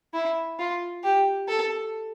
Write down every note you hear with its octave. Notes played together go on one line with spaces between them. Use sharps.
E4
F4
G4
A4